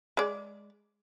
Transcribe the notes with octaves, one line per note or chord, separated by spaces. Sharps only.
G#3 D5